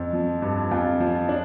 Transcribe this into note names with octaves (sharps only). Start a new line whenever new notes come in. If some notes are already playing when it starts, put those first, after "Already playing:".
Already playing: F2
F3
G2
F2 F4
F3
D4